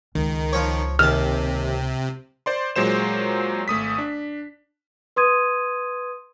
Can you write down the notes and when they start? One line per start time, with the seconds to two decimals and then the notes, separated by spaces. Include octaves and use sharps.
0.15 C#2 D#3
0.53 F3 C#5
0.99 D#2 C3 A5 F6
2.46 C5 D5 C6
2.76 A#2 F#3 G#3 C5 E7
3.68 G#1 A3 D#6 B6
3.98 D4
5.16 B4 C6 D#6 G#6 D#7